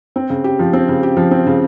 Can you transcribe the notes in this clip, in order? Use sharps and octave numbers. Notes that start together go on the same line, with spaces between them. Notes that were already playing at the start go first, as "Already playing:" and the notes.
C4
C#3
G4
F3
C4
C#3
G4
F3
C4
C#3